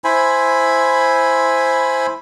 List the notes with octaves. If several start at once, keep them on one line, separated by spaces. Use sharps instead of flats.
E4 C5 G#5 B5